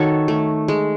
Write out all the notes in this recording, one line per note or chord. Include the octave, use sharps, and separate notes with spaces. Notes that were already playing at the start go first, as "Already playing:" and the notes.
Already playing: D#3 F#4 A4 C#5
A3
G#3